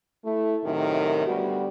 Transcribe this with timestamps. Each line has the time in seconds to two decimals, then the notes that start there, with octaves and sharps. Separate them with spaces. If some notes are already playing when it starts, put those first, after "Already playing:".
0.24 A3 E4
0.64 F#2 A2 C3 D#3
1.26 D2 G3 B3 F#4